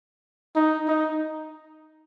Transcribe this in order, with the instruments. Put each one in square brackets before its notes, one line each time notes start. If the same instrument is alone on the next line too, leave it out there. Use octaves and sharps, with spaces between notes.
[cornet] D#4
D#4